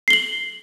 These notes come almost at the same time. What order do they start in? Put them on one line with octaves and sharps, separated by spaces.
C7 G7 F#7